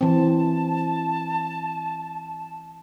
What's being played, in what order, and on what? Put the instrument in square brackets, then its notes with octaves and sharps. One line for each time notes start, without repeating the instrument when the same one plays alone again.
[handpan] E3 C4 [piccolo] A5